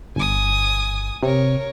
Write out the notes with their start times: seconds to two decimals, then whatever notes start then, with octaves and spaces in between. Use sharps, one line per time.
0.16 G1 G#5 D#6
1.23 C3 A#4 C#5